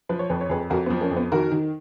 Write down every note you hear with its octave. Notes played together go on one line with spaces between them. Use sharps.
F3 B4
C#5
F2 B4
C#5
F2 G#4 B4
F2 F#4 A#4
B3
F3
A#3 C#4
F2
B3
D#3 F#4 A#4
D#3